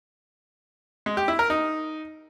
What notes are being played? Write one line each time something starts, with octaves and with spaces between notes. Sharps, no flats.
G#3
G4
E4
A#4
D#4